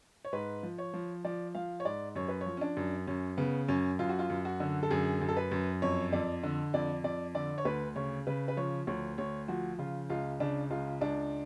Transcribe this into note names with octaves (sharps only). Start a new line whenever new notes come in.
C#5
G#2 B4
F3
C#5
F3
F3 D5
F3 F5
C#5
G#2 D5
F#2 C#5
B4
C#5
F3
C#4
D4
F#2
F#2 C#4
C#3 B3
F#2 C#4
F#2 F4
F#4
F4
F#2
F#4
D3
A4
F#2 G#4
F#2
A4
B4
F#2
F2 C#5
F2 D5
D3
F2 D5
F2 D5
D3 D5
C#5
D2 B4
C#3 C#5
C#3 B4
B4
F3 C#5
D2 C#5
D2 C#5
F3 F#4
C#3 F4
C#2 F4
C#3 D4
C#2 F4
C#2 D4